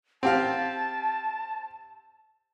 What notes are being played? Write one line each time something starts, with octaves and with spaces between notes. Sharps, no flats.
C4 G4 F5 A5